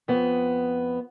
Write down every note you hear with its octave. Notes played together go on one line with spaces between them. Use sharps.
F2 B3